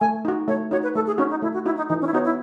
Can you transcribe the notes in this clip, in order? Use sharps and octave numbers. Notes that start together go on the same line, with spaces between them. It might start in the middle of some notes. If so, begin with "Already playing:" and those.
A3 G#5
D#4 F#4
A3 C#5
D#4 F#4 C#5
B4
A3 A4
G#4
C#4 D#4 F#4
D#4
A3 E4
F#4
D#4 E4 F#4
D#4
E3 D#4
C#4
E4
B3 D#4 F#4 C#5
E4